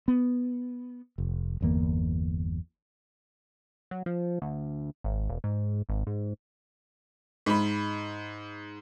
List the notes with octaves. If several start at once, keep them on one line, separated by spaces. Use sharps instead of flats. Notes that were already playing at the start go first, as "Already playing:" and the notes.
B3
F1
G1 E2 A#3
F#3
F3
D2
G#1
E1
G#2
G#1
G#2
G#2 B5